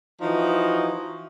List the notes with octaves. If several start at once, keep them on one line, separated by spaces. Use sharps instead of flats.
E3 F3 D#4 F#4